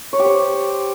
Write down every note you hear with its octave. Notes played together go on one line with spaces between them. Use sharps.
C#5
G4
C5